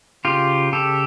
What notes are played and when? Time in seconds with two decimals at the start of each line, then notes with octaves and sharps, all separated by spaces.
0.25 C#3 F4 G4
0.72 C#3 G4 A4